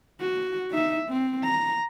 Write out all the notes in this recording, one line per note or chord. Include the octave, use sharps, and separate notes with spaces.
F#4
D#4 E5
C4
A#5